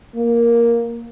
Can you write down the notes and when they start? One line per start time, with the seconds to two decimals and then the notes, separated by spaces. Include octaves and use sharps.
0.16 A#3